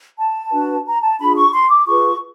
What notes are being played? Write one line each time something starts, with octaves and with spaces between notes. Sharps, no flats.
A5
D4 F#4 B4
A#5
A5
D4 F4 G#4 B5
C#6
C6
D6
F4 G#4 B4 C#6